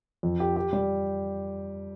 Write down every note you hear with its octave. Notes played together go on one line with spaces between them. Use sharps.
F2
G4
G4
G3